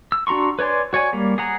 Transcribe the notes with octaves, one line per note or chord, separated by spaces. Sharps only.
E6
D4 F#4 A#5 C6 C#6
B4 C#5 D5 G#5 C6
F#4 C#5 D5 G#5
G3 A#3
G#4 F#5 A#5